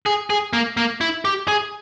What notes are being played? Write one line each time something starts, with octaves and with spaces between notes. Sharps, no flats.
G#4
G#4
A#3
A#3
E4
G4
G#4